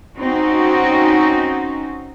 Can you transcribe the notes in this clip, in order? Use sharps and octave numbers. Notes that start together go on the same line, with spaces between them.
C4 C#4 D#4 F#4